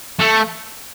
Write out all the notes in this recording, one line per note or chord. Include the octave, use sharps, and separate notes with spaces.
A3